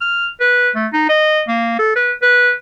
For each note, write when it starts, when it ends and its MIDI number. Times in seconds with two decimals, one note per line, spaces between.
0.01 0.28 89
0.40 0.70 71
0.75 0.87 57
0.93 1.08 63
1.09 1.42 75
1.48 1.78 58
1.79 1.95 69
1.96 2.13 71
2.22 2.52 71